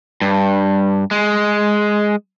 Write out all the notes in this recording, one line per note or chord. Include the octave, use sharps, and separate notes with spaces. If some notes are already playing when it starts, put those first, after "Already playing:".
G2
G#3